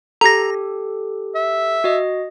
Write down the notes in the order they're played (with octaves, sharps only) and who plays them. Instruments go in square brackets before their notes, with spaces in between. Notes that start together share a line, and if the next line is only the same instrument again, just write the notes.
[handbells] G4 A4 [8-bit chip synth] A#5 A#6
[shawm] E5
[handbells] F#4 D#5